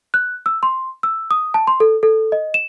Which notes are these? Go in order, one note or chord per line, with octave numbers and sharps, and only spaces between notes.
F#6
E6
C6
E6
D#6
A5
C6
A4
A4
D#5
E7